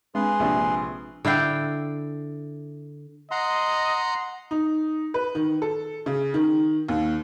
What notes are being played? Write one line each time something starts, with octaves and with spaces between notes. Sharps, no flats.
G#3 C4 D4 G#4 B4 C6
A#1 C3 D4 E5
D3 E4 F5 G5
D#5 F#5 A#5 C6
D#4
B4
D#3
A4
C#3
D#3
D#2